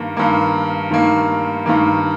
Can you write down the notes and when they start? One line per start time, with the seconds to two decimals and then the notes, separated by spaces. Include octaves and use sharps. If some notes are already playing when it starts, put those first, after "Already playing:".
Already playing: G2 D#3 A#3
0.17 G2 D#3 A#3
0.91 G2 D#3 A#3
1.66 G2 D#3 A#3